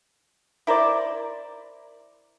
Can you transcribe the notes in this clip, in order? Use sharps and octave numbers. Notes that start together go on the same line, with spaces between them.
E4 A#4 C5 D5